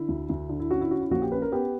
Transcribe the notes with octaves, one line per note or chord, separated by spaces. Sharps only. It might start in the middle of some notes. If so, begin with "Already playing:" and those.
Already playing: D3 E4
D2
D2
D3
E4
C#4 F#4
E4
C#4 F#4
E4
A#1 F#4
G4
C#4 B4
A#4
B3 G4